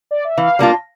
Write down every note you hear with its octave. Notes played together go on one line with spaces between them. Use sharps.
D5
E5
E3 F5
G3 A#3 D4 F4